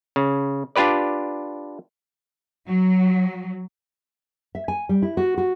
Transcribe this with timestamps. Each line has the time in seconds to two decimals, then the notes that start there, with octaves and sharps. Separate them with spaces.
0.16 C#3
0.76 D4 F4 G4 B4 D5
2.68 F#3
4.55 E5
4.68 G#5
4.89 G3
5.02 E4
5.17 F#4
5.38 F#4